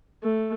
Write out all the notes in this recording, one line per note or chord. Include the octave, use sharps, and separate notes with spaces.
A3